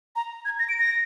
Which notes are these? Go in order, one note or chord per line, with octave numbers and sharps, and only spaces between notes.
A#5
G#6
A#6
D7
A#6